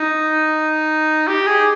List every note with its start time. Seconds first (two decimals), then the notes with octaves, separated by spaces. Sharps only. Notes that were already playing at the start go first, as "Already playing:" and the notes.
Already playing: D#4
1.28 G4
1.47 G#4